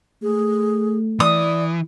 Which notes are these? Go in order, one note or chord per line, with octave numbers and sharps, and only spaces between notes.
A3 G#4
E3 D5 D#6